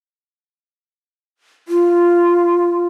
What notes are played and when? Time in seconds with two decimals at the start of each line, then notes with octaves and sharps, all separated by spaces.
1.68 F4